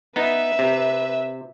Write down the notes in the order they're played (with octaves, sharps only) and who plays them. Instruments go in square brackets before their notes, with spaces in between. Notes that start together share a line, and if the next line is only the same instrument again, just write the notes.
[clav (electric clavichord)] B3 D#4 [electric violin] B4 E5
[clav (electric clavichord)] C3